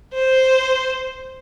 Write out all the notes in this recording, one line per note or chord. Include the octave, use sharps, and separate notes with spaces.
C5